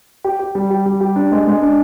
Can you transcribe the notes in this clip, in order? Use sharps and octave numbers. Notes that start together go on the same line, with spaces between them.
G4
G4
G3
G4
G3
G4
D4
G#3
G#3
D4